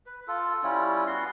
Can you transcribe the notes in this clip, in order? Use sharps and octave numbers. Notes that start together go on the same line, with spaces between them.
B4
F4 A4
G3 C#4 E4 F4
B3 F#4 C6